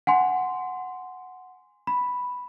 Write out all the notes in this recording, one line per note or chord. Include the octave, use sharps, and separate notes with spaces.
F#5 G#5 C6
B5